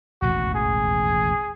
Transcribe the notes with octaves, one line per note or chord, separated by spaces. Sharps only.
E1 A1 D#2 F#4
G#4